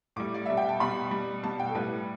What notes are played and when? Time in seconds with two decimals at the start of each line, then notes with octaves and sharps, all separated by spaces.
0.16 A2 G3 D6
0.34 D5
0.46 B2 G3 E5
0.57 G5
0.69 A5
0.80 B2 G3 B5
1.11 B2 G3
1.43 B2 G3 A5
1.60 G5
1.69 A4
1.75 A2 G3 B4